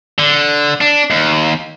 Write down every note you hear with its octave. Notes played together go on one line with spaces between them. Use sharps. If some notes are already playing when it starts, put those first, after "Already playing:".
D3
D4
D#2